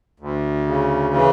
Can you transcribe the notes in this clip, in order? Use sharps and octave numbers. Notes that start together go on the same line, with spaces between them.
D2
C#3
E3